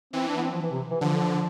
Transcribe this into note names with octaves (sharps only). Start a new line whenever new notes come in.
E3 C4
D4
B3
C4
F3
E3
C3
E3
D3 F3